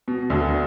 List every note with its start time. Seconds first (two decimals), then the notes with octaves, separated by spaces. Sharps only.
0.08 B2
0.30 D2 D3